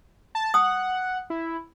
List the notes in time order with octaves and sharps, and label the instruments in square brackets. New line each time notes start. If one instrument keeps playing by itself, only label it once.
[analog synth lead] A5
[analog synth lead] F#5 [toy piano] A5 D#6
[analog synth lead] E4